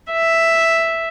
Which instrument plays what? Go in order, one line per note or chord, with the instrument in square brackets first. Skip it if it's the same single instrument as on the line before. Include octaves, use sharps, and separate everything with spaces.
[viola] E5